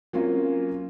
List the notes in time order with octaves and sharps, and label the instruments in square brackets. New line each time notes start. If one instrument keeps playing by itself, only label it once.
[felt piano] F#3 A#3 C4 C#4 F4